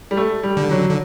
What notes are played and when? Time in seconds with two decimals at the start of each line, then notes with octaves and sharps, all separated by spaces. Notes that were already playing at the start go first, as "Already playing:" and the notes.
0.11 G3
0.17 A3
0.43 G3
0.57 D3
0.71 F#3
0.89 D3